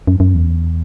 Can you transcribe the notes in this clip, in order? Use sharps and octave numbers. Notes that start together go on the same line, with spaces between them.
F#2
F#2
E2